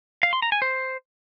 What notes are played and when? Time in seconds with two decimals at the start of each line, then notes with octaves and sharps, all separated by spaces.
0.23 F5
0.33 C6
0.42 A#5
0.52 G#5
0.62 C5